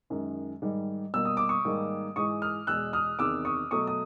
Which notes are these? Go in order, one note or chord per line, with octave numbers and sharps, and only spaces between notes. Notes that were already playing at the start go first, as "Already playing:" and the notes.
F#2 D#3 G#3
G#2 D#3 G3
B2 G3 A#3 E6
D#6
D6
C#6 D#6
G#2 D#3 G3 A#3
G#2 E3 G#3 C#6 D#6
D#6 F6
E2 B2 G#3 E6 F#6
D#6 F6
E2 C3 D#3 D6 E6
C#6 D#6
B2 F#3 A3 C#6 D#6
D#6